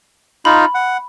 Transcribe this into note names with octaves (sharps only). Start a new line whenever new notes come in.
D#4 F4 B5
F#5